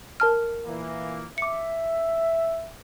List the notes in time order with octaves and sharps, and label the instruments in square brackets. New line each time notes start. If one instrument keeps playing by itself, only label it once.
[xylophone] A#4 A5 F6
[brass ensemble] A#2 E3 A#3
[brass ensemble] E5 [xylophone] D6 C#7